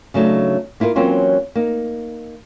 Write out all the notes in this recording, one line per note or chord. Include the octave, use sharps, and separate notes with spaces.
C#3 F#3 A3 D4 D#4
A#3 E4 F4 A4 A#4
E3 F#3 A#3 C4 C#4 F4
A#3 D#4